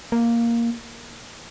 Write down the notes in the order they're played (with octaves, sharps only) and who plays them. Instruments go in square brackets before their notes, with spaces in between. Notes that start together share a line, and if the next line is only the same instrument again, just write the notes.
[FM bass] A#3